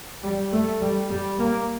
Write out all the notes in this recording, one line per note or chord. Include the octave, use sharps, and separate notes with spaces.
G3
A3
G3
G3
A#3